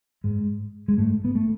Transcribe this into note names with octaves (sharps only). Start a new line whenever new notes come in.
G#2 G#3
G#3
G#2 A3
B3
A3